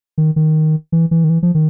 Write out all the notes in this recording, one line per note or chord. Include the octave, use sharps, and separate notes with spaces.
D#3
D#3
E3
E3
D#3
E3
F3
D#3